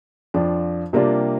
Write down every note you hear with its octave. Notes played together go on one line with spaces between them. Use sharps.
F2 F3 D4 F4
C3 G3 A#3 D4 F4